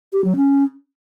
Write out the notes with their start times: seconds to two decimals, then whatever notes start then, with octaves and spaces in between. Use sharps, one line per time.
0.13 G4
0.24 F#3
0.36 C#4